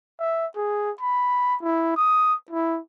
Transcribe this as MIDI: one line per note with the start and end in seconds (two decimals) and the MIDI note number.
0.20 0.46 76
0.56 0.91 68
1.01 1.56 83
1.62 1.92 64
1.96 2.34 87
2.50 2.79 64